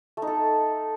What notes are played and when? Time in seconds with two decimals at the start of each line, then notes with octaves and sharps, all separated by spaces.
0.17 A3
0.22 D#4
0.27 A4